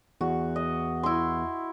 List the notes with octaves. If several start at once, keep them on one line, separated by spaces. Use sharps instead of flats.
E2 F#4
D#5
E4 C6